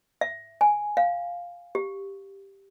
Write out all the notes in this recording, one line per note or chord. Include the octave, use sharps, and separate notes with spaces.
E5
G#5
F5
G4